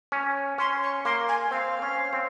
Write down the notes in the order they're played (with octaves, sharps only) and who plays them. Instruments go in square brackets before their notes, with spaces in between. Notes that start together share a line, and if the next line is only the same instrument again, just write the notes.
[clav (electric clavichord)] C#4
[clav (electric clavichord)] C#4 [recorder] C6
[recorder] C#6
[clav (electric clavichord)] A#3 [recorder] C6
[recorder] G#5
[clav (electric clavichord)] C4 [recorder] F5
[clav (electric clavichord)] C#4
C4